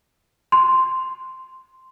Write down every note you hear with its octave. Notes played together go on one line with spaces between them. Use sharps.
C6